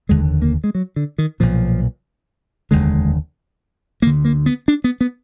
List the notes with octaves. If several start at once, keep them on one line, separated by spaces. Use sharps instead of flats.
F1 D#2 D3 G#3
A#3
G#3
F#3
D3
D#3
B1 A#2 F3
F1 D#2 D3 G#3
D2 D3 A#3
A#3
B3
D4
B3
B3